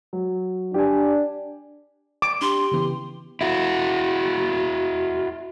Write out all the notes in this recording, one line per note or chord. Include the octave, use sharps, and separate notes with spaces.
F#3
D4 G4 G#5
D6
D4 G4 C6
C#3 E3 B3
E4 F#4